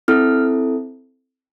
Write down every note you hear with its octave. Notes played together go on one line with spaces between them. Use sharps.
C4 E4 A4 F6